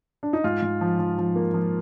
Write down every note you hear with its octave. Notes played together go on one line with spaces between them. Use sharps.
D4
D#4
G#2 F4
G#2
F3
F3
F3
A#3
F3